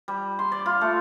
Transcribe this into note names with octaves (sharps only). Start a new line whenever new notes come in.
G3
C6
D5
F4
A3